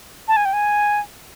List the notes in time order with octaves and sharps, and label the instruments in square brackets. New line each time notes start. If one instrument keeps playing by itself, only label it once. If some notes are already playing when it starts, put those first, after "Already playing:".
[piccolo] A5
G#5
G5
G#5